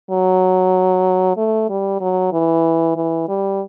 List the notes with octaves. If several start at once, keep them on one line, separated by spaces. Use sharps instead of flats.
F#3
A3
G3
F#3
E3
E3
G3